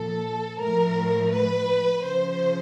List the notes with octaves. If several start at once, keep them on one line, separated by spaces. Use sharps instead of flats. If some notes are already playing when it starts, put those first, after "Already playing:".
Already playing: A#2 F3 A4
A2 F3 A#4
B4
C#3 F3 C5